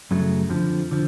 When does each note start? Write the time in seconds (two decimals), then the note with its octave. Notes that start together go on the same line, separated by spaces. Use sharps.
0.11 F#2 C#3 F#3 A3
0.49 F2 D3 F3
0.91 D3 F3